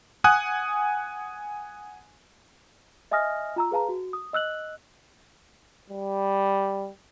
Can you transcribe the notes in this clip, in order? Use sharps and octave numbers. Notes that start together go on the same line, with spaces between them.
F#5 G#5 D#6 F#6
D#5 E5 G#5 D#6 F6 A#6
F4 A#5 E6
G#4 B4 F5 A5 A#5
F#4
D#6
D#5 E6 F#6 F#7
G3